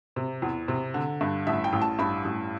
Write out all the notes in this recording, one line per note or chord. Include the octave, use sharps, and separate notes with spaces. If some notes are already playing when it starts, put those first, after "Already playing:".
C3
E2
C3
D3
G2
A1 E5
G5
A1
A5
G2 B5
A1